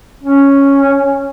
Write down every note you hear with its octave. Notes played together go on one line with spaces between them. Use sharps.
C#4